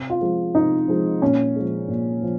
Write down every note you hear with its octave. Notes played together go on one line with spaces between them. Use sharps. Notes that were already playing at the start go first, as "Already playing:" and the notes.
Already playing: C3
F4
F3 G#3
C3 D#4
F3 G#3
A#2 C#4
F3 G#3
A#2
F3